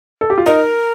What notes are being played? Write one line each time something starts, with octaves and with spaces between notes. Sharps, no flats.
A4
G4
F4
D#4 A#4